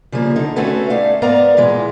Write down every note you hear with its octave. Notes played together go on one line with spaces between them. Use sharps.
C#3 F3 G3 A3 A#3
D3 D#4
A3 C4 C#4 F#4 A4 B4
A3 D#4 D5 F5
G#2 B3 A#4 D5 F5 A#5
A#2 E3 G#3